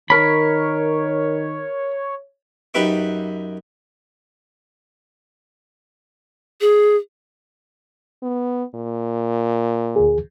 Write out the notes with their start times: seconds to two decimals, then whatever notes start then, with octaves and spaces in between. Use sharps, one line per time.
0.10 D#3 A#4 C#5 B5
2.74 F#2 D#4 G4 B4 E5 D6
6.61 G#4
8.22 B3
8.74 A#2
9.96 D2 G#4